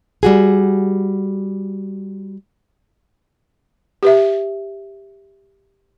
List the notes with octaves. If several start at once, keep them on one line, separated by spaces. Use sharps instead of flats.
G3 F#4 G#4
G4 B4 E5